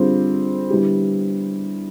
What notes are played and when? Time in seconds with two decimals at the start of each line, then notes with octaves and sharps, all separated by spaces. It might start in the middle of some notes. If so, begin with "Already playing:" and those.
Already playing: D3 G3 C4 F4 G#4
0.70 D3 G3 B3 E4 G4